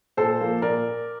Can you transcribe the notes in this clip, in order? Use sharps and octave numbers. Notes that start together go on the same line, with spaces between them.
A#2 A4 C5
F3 A#3 F4
A#2 A#4 D5